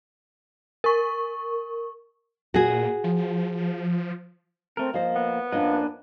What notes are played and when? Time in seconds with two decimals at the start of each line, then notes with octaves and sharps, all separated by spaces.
0.84 A#4 C#6
2.54 A#2 F#4 G#4
3.04 F3
4.77 A3 C4 A#4
4.94 F3 A#3 C5 D#5
5.16 B3
5.52 F2 A#3 C#4 D4 F4 B4 D#5